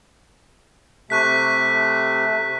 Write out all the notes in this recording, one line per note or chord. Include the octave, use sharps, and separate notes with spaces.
C3 A3 C#6 F#6 B6